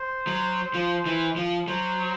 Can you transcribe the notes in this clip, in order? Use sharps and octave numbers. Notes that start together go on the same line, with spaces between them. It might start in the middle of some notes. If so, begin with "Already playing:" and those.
Already playing: C5
F#3
F3
E3
F3
F#3 C5